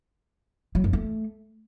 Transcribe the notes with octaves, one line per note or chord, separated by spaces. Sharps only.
F#3
F#2
A3